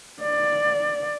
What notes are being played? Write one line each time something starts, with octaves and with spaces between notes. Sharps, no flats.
D5